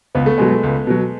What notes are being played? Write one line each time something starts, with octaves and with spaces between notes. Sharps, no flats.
C#2 B3
A3
B2 F#3 G#3
A3
C#2
B2 F#3